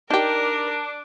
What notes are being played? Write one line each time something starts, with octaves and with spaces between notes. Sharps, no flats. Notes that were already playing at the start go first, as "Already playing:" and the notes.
D4 D#4 G4 A#4